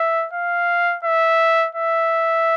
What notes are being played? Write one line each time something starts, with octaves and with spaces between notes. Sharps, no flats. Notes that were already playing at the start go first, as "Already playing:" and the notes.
Already playing: E5
F5
E5
E5